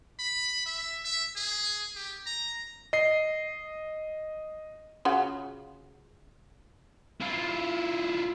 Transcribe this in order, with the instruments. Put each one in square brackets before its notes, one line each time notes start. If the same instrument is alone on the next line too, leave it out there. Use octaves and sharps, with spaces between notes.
[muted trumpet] B5
E5
E5
G#4
G4
A#5
[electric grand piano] D#5 C7
[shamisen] C#3 F4 F#4
[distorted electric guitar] E4 F4